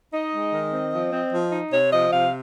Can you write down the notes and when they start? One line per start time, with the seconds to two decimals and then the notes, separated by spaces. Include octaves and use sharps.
0.13 D#4 D#5
0.32 G#3
0.54 D#3
0.72 C4
0.93 F3
1.13 C4
1.32 F3
1.52 D#4
1.72 C3 C#5
1.91 F3 D#5
2.12 C3 F5